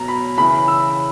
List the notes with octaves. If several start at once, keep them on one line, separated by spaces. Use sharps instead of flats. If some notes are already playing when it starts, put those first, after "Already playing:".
Already playing: B2 F#3 A#5
B5
C#3 E3 B5
E6